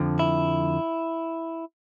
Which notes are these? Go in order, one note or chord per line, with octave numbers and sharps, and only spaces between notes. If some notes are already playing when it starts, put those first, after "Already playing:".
Already playing: F2 D3 F3
E4